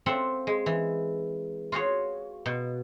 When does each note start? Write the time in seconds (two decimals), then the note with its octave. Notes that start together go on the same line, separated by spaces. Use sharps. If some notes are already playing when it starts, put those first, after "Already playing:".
0.06 C4 F4 A4 E5 F#5
0.47 G#3
0.66 E3
1.72 F4 F#4 G#4 C#5
2.46 B2